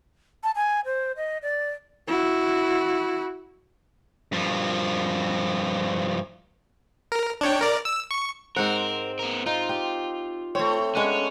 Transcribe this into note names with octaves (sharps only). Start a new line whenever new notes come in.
A5
G#5
C5
D#5
D5
E4 F#4
G2 F3
A#4
D4 C#5 G5
A#4 D5
E6
C#6
G#2 C4 A#4 F#5
B3 A#4
D#4 F4
G4
A3 C4 C#5
G#3 B3 C#4 D4